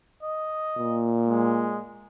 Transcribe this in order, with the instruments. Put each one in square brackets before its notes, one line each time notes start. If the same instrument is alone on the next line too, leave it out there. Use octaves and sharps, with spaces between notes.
[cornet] D#5
[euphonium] A#2
[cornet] G#3